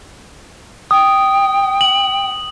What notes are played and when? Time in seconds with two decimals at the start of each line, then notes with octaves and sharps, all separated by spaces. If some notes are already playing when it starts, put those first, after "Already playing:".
0.91 G5 D#6
1.81 F#7